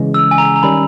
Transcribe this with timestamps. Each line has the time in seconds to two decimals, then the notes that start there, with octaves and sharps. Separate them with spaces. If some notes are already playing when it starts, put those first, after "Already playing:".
Already playing: C#3 E3 G#3 C#4
0.14 E6
0.31 G#5
0.38 A#5
0.56 A#5
0.63 D#3 G3 C#4 B5